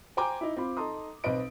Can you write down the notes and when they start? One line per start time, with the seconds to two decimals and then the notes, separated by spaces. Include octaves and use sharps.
0.17 C5 G5 G#5 A#5 D6
0.41 D#4 E4
0.57 C4 F4 B5
0.77 D#4 A4 A#5 C6 D#6
1.24 B1 C4 B4 D#5 D7